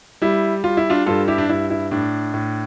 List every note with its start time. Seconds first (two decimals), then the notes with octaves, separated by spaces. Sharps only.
0.22 G3 E4
0.64 G3 F4
0.77 E4
0.90 D4 F4
1.06 G2 F4 A4
1.28 E4 G4
1.38 D4
1.49 G2 E4
1.70 E4
1.91 A2 D4
2.34 A2